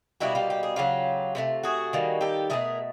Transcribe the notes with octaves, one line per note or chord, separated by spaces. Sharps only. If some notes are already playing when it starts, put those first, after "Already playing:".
B2 G3 A#3 E4 F#4
F4 G4
G4
G#4
C#3 F#3 A3 F4 G4
C3 E3 A3
F#4 G#4
D#3 G3 A#3
G4 A4
B2 F#3 A3 G#4 A#4